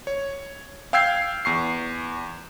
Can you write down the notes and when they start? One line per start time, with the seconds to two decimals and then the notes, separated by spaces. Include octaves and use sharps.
0.07 C#5
0.93 F5 G5 E6 G6 G#6 C7
1.45 E2 C#6 C7